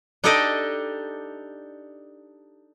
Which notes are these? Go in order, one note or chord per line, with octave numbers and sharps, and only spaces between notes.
D4 D#4 G4 A4 D5 D#5